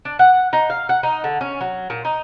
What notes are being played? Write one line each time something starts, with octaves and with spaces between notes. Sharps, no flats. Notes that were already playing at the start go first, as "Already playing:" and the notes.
D4
F#5
D#4
F5
F#5
D#4
D3
C#4
F#3
A#2
D#4